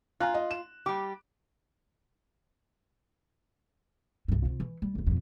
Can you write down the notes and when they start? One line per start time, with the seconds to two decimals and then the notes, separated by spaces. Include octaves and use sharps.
0.20 F4 G#5 A#5 F#6
0.34 D#5
0.51 E7
0.86 G3 G4 D6
4.28 C2 G2
4.45 C3 F4
4.60 E3
4.82 G3
4.95 F1 E2
5.07 F2 B2